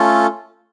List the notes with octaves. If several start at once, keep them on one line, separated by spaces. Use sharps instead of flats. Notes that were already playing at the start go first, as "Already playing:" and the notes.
Already playing: A3 C#4 F4 A4